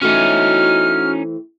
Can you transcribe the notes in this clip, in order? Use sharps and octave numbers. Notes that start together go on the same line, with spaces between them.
E3 A3 C4 C#4 D#4 F#4 F6